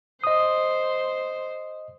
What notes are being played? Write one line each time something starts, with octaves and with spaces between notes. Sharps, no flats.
C5 D#5 D#6